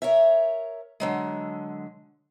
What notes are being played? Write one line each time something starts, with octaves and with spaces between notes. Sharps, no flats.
A#4 C#5 E5
D3 F#3 G#3